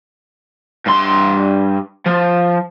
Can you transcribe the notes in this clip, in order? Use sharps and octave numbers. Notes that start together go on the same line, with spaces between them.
G2 C6
F3